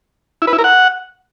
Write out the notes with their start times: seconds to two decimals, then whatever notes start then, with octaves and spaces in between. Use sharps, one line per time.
0.42 E4
0.47 B4
0.53 E4
0.59 A#4
0.64 F#5